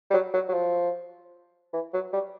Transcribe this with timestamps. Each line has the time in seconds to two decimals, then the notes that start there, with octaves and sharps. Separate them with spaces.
0.10 G3
0.14 F#3
0.34 F#3
0.49 F#3
0.53 F3
1.73 E3
1.94 F#3
2.13 G3